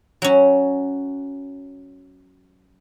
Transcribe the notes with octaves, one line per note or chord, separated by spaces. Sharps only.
F#3 C#4